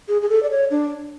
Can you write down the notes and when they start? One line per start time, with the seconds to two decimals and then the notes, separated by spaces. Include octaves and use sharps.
0.08 G#4
0.22 G#4
0.29 A4
0.43 D5
0.50 C#5
0.71 D4